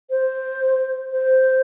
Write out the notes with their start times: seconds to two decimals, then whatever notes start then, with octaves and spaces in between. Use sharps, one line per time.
0.10 C5
1.12 C5